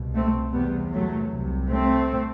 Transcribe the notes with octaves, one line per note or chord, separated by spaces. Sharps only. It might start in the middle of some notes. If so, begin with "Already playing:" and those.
Already playing: C2 B2
A3 C4
E2 C3 G3 B3
F#3 A3
C2 C3
A3 C4